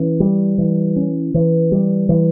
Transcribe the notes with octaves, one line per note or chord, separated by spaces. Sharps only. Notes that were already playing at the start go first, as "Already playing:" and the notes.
Already playing: E3 C#4
G3
E3
C#4
E3
G3
E3